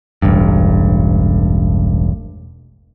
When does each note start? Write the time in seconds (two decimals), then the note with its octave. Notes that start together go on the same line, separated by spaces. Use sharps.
0.22 E1 A1 G2